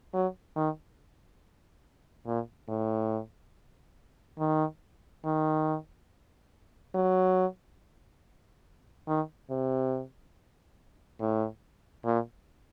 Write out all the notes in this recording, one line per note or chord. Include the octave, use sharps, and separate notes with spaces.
F#3
D#3
A#2
A2
D#3
D#3
F#3
D#3
C3
A2
A#2